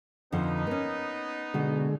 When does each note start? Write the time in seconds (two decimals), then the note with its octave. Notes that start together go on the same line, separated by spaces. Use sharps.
0.32 F2 D3 F3 B3 D#4
0.67 A#3 C#4
1.54 B2 D3 G#3 F#4